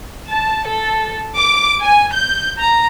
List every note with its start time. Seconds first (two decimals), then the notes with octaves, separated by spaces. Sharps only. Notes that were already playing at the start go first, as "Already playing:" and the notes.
0.27 A5
0.66 A4
1.36 D6
1.81 G#5
2.14 G6
2.58 A#5